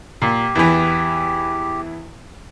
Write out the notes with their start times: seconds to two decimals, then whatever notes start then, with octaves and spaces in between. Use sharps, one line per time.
0.22 A#2 G4
0.55 E2 E3